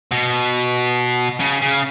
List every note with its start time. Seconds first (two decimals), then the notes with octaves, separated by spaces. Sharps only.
0.12 B2
1.40 C#3
1.62 C#3